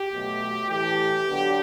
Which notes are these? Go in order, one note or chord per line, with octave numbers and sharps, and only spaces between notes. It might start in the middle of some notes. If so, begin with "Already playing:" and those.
Already playing: G4
B2 F#3 A3
A2 E3 A3 G4
D3 F#3 B3